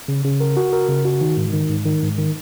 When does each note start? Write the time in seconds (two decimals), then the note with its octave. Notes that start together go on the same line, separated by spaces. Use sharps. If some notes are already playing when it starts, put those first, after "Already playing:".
0.08 C#3
0.24 C#3
0.40 A#4
0.57 F#4
0.73 A#4
0.89 C#3
1.05 F#4
1.21 D#3
1.37 G#2
1.53 D#3
1.69 G#2
1.85 D#3
2.02 G#2
2.18 D#3